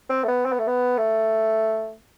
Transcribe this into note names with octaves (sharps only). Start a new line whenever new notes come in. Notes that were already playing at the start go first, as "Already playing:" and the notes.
C4
A3
B3
C4
B3
A3
B3
A3